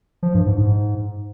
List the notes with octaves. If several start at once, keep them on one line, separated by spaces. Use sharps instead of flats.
F3
G2
G#2
G#2